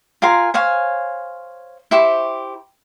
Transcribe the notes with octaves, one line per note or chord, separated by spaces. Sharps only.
F4 A#4 G#5 C6
C5 C#5 F5 G#5
E4 G4 C5 C#6